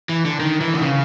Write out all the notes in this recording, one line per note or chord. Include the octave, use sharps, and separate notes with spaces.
E3
D3
D#3
E3
D3
C#3